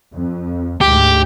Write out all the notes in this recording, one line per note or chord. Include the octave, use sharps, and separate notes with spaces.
F2
D2 G#2 G4